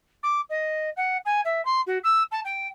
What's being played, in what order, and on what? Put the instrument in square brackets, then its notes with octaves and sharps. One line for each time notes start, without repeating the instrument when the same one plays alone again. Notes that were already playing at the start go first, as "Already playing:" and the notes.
[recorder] D6
D#5
F#5
G#5
E5
C6
F#4
E6
A5
G5